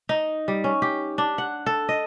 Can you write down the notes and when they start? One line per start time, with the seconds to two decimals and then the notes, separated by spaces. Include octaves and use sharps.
0.09 D#4
0.48 G3
0.64 C#4
0.82 G4
1.18 D4
1.38 F#5
1.66 A4
1.89 D#5